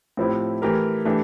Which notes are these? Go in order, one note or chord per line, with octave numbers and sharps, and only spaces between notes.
A2 F3 C4 E4 G4
E3 A3 E4 G4 A#4
E3 A3 D4 G4